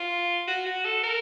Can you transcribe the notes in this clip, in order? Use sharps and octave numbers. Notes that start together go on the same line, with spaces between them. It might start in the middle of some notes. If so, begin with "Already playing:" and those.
Already playing: F4
F#4
F#4
A4
A#4